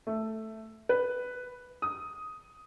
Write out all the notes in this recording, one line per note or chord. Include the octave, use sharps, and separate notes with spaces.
A3
B4
D#6